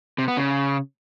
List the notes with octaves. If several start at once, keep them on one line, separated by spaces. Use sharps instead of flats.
C3
B3
C#3